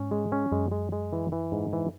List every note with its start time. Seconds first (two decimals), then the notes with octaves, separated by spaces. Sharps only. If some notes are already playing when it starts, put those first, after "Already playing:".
Already playing: G#2 C#4
0.11 G#3
0.32 C#4
0.51 F#2 G#3
0.72 G#3
0.92 G#3
1.13 E3
1.32 E3
1.52 G#2
1.73 E3